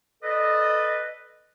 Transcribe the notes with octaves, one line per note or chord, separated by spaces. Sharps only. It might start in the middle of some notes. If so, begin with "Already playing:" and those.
A4 B4 D5 D#5